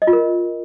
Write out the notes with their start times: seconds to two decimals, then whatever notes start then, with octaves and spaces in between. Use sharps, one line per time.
0.02 D#5
0.07 F4
0.13 A#4